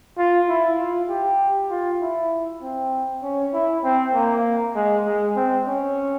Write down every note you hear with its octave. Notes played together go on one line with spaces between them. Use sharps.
F4
E4
F4
G4
F4
E4
C4
C#4
E4
C4
A#3
G#3
G#3
C4
C#4